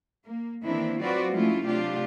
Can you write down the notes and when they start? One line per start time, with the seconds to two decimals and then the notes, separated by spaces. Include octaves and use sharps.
0.24 A#3
0.63 D#3 E3 A#3 C4 D4 E4
1.00 F#3 C4 F4 F#4 B4 D5
1.31 F3 G#3 A3 C#4 E4 F4
1.66 C3 F#3 D4 F4 G4